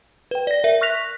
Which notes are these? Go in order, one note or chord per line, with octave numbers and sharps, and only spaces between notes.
B4 G5
D5 A#6
A#4 E5
C#6 F6 F#6 A#6 B6 F7